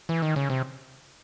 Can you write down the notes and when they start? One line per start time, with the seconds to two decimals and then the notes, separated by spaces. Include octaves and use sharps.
0.09 E3
0.22 D#3
0.36 C#3
0.50 C3